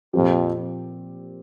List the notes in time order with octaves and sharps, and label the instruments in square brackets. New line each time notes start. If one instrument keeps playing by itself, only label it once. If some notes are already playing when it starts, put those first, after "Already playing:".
[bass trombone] F2 [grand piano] A#2 F3 C4 G4